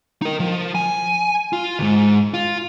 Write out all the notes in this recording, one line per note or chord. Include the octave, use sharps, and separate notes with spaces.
D#4 A#4
F3
G#5
F4
D2 G#2
F4